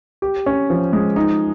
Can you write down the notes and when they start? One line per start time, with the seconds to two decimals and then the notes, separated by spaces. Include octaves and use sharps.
0.22 G4
0.46 C#4
0.70 F3
0.93 G#3
1.16 D#4